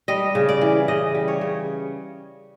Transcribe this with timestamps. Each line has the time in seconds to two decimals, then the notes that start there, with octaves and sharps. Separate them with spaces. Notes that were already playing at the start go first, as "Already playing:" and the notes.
0.08 G3 D#5
0.35 C#3
0.49 D5
0.61 E3
0.88 C#3 D#5
1.15 G3
1.28 C#5
1.41 C#3